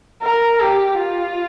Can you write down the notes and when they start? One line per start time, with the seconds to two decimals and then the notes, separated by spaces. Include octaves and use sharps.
0.22 A#4
0.60 G4
0.98 F4